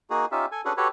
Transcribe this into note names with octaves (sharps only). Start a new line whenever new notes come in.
A#3 D#4 F#4 G#4
C#4 D#4 F4 G4 E5
A4 G#5
C#4 D4 F#4 G#4 A4 B4
F#4 G4 A4 B4 C#5